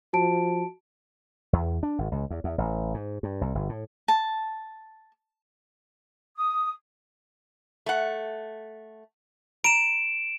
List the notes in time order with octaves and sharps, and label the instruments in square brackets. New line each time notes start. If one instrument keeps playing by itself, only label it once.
[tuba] F3 [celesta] F#4 A5 D7
[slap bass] E2
D4
G#1
C#2
E2
E2
A1
G#2
G2
C2
G1
A2
[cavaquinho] A5
[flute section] D#6
[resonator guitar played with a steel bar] A3 F#5
[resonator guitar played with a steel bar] A#5 [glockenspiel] D7 E7